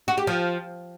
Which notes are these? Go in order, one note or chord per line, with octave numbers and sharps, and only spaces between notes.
F#4
G4
F3